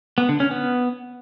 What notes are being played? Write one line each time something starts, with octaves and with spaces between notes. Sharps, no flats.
B3
D3
C#4
B3